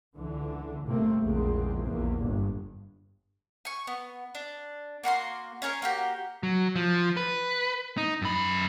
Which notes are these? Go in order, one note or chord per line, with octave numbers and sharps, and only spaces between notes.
C#2 D3 E3
G1 C3 A3 A#3 C4
A#1 E2 A#2 C#3 G#3 C4
A#1 E2 A#3
G1 G2
G#5 C#6
B3
D4
A#3 F#4 B5 C6
C#4 G#4 A#4 C#5
A#3 F#4 G4
F#3
F3
B4
D#4
F#2 B5